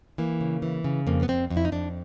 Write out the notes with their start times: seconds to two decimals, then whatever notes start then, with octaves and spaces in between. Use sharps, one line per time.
0.18 E3 A#3
0.41 C#3
0.62 E3
0.84 C#3
1.07 F2 A#3
1.23 B3
1.28 F2 C4
1.50 F2
1.57 E4
1.65 D#4
1.72 F2 D4